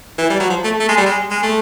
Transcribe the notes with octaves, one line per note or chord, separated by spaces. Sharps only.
E3
G3
F#3
F3
A3
A3
G#3
G3
G#3
G#3
A3